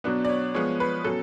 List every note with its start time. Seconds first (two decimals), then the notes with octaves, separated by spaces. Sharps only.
0.04 B2 F#3 B3 D4
0.25 D5
0.29 C#5
0.55 F3 G#3 B3 C#5
0.80 B4
1.05 B2 F#3 C#4 A4